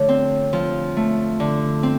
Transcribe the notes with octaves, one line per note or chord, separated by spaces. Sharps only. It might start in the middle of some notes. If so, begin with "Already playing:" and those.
Already playing: D3 F3 A3 C#5
C4
F3
A3
D3
C4